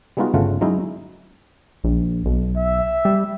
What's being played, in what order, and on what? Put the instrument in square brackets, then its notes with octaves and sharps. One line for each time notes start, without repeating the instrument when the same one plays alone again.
[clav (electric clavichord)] G3 G#3 B3 D#4 F4 F#4
G1 C#3 A3 F4 F#5
F#3 G#3 C#4 D#4 E4
[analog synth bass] A#1
B1
[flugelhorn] E5
[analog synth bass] G3